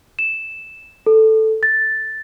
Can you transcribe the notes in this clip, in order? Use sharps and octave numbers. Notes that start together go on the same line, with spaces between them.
E7
A4
A6